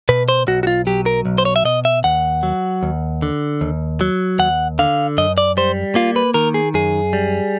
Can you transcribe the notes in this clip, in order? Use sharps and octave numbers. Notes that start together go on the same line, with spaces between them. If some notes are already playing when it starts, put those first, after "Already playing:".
B2 B4
C5
B1 F#4
F#4
F4
F#3 G4
A#4
B1
C5
C#5
E5
B2 D#5
E5
D#2 F#5
F#3
D#2
D3
D#2
F#3
D#2 F#5
D3 F5
F#2 D#5
D5
G3 C5
A#3 F4
B4
D#3 A#4
G#4
F#2 G#4
G3